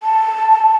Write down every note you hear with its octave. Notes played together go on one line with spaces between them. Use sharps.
A5